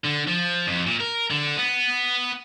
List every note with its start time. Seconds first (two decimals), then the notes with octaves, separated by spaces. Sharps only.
0.05 D3
0.28 F3
0.67 F2
0.87 A#2
1.00 A#4
1.31 D3
1.57 B3